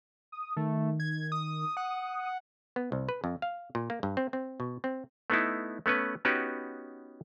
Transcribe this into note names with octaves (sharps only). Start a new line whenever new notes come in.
D#6
D#3 A3
G#6
D#6
F#5 D#6
B3
C2
B4
F2
F5
A#2
A#3
G2
C4
C4
B2
C4
A3 B3 D#4 E4
A3 B3 C#4 B4
B3 C#4 D#4 F#4 G4 B4